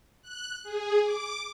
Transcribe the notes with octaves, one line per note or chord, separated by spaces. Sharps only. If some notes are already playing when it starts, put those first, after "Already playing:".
F#6
G#4
D6